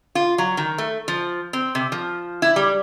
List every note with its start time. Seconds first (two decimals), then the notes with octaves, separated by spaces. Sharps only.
0.15 F4
0.38 F#3
0.57 D#3
0.78 A3
1.08 F3
1.53 C4
1.75 C3
1.92 F3
2.42 E4
2.56 G3